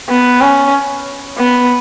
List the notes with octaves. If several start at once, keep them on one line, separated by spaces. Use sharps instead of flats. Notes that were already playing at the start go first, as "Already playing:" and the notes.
B3
C#4
B3